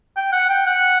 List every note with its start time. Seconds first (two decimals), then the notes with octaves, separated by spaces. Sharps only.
0.16 G5
0.33 F#5
0.49 G5
0.66 F#5